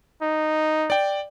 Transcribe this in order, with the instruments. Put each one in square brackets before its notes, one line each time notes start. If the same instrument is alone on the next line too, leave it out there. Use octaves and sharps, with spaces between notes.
[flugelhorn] D#4
[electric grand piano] D5 G5